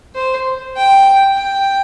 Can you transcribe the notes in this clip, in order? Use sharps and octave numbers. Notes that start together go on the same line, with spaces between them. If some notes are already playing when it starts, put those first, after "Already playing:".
C5
G5
G5